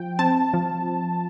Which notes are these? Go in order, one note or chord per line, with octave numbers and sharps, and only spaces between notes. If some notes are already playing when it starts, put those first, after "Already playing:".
Already playing: F3 G5
C4 A5
F3